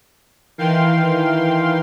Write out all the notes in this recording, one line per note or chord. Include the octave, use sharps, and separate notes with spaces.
D#3 E3 F5 G5 C6